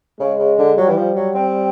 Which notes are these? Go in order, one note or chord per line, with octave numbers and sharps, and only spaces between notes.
C#3 G#3
C#3
D3
F#3 G3
E3
F3
F#3
C4